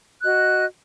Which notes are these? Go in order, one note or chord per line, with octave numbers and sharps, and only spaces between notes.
F#4 D#5 F#6